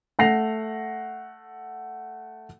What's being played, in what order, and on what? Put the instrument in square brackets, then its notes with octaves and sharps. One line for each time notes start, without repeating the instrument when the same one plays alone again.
[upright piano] A3 F#5 A#6 C7 F7